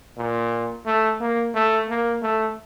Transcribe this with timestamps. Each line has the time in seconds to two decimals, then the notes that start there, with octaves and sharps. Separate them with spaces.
0.17 A#2
0.86 A3
1.21 A#3
1.55 A3
1.89 A#3
2.23 A3